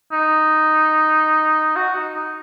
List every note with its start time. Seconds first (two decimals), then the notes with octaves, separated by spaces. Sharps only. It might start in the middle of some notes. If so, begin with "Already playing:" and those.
0.12 D#4
1.76 F#4
1.96 D#4
2.16 D#4